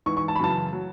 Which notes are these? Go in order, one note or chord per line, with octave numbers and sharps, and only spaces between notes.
G#2 E3 C#6
C#6
A5
B5
F#2 C#3 E3 A5
F#3